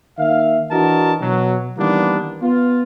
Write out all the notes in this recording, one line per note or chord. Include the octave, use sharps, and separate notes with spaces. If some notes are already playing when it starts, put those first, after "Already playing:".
D#3 A#3 E5 F5
E3 D4 F#4 A#4 D#5 A5
B2 F#3
D#3 E3 G3 A#3 B3 D4
B3 F4